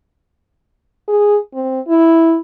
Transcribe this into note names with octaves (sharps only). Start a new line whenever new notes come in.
G#4
C4
E4